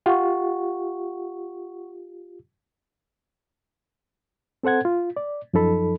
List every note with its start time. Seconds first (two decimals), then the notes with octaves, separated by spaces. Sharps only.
0.06 F4 G4 F#5 C#6
4.63 C4 A4 C5 F#5 G#6
4.85 F4
5.16 D5
5.54 F#2 F3 D#4 A4 B5